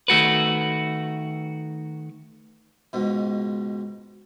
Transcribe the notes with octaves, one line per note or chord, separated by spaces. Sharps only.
D#3 A3 F#4 B4
C#2 G#2 B2